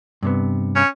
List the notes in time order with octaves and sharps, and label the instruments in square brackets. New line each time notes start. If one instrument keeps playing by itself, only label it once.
[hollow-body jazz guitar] G2 C3 B3
[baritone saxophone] C#4